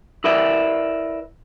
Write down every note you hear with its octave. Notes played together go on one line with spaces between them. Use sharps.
E4 A#4 B4 D5 E5